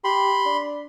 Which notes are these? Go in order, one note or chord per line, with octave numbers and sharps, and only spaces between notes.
G4 B5 C6
D4